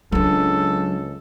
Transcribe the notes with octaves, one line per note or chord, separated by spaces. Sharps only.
C#2 F#3 D4 A4